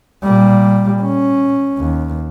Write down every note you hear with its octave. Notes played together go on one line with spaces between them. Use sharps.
A#2 G3
C#4
D#2